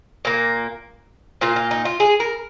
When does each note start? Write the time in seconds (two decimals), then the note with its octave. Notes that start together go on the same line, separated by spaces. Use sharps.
0.25 A#2 A#3
1.41 A#2 A#3 F4
1.56 F4
1.71 D#4
1.85 F4
2.00 G#4
2.20 A#4